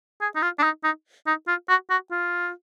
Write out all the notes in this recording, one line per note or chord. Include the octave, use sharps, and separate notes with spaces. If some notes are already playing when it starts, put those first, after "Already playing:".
G#4
D#4
F4
D4
D#4
D#4
D#4
F4
F#4
F#4
F4